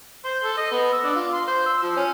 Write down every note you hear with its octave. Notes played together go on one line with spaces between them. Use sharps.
C5
A4
D#5
B3
E6
D4
F4
C6
C5
E6
F3
C#4